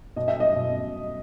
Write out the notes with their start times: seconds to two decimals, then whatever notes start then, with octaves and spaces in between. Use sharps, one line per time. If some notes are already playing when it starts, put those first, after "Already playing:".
0.16 B2 D#5
0.28 E5
0.40 D#5
0.56 B2